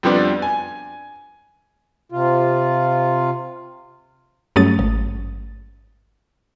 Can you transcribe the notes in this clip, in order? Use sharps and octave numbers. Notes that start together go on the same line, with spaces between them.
F2 F3 G3 B3 D4
G#5
C3 F4
G2 F#3 A3 C#4 D#6 A6
G#1